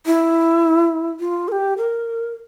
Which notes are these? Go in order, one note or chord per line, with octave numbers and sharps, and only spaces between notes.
E4
F4
A#4
G4
A#4